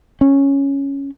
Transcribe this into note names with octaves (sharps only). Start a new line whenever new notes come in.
C#4